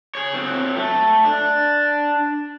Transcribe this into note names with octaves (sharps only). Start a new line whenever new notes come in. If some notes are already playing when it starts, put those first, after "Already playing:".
G#4 C#5
F#3 C4
A3
D4